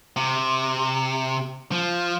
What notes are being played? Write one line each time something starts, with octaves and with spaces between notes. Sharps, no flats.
C3
F3